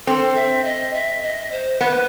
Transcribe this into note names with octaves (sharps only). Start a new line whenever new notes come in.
C4 A4
E5
D#5
E5
D#5
C5
B3 B4